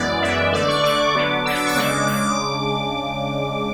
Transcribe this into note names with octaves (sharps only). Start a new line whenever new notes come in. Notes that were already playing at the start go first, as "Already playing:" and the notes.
Already playing: F#2 E3 G#3 B3 D5
F#2 E3 G#3 B3 E5
D3 A3 D4 D5
C#6
D3 A3 D4 D6
D3 F#3 B3 D4
D3 F#3 B3 D4 E6
D6
C#6
C#3 G#3 D4 D6
C#3 G#3 D4 D6